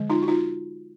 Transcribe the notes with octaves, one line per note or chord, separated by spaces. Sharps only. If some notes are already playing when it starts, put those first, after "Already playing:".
Already playing: D3 F3 G#3
D#4 F4
F#4
D#4 F4